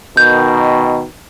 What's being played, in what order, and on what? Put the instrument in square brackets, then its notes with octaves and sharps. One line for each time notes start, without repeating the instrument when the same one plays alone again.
[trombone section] B2 D#3 [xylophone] G6